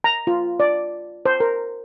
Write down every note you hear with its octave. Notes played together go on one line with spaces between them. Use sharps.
A#5
F4
D5
C5
A#4